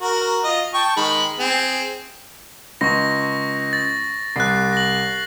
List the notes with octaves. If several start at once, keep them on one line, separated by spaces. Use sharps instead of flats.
F#4 A#4
F4 D#5
G5 A5 C#6
D#3 G#3 B5
C4 G#4
C#2 C#6 A#6
A6
C2 F#6 C7
A#6 F#7